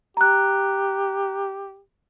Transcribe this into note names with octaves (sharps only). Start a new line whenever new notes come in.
G4 A#5 F#6